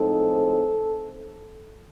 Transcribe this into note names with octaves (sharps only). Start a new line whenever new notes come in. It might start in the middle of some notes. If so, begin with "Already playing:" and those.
Already playing: A2 F3 G#3 C4 D#4 A4